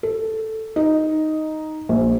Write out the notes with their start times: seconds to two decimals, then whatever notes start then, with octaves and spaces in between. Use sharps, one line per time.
0.03 A4
0.76 D#4
1.89 A#1